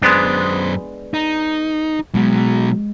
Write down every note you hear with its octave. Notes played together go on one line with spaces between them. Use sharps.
F#2 G#3 B3 D4 C5
D#4
B2 F#3 G#3